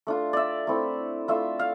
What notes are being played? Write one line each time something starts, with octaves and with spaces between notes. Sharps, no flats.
A3 D4 F4
D5 E5
A3 C4 E4
A3 D4 F4 E5
F5